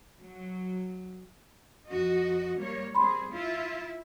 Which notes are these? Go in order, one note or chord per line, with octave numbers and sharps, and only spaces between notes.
F#3
F2 F#4 D#5
G3 A#3 C#5
G3 C4 G#4 B5 C6
E4 F4 E5